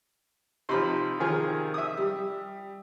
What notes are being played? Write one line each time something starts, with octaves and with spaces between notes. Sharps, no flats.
C3 F3 D#4 B5 C6
D#3 F3 G#4
E5 D#6
G3